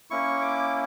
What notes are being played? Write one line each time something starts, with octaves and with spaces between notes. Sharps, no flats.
A#3 C#4 E4 C#6
D6